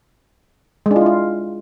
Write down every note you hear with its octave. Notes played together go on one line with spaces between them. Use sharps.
G#3
D4
F4
E4
F4